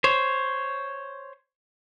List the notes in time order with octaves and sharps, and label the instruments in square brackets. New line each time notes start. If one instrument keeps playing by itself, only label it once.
[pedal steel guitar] C5 C#5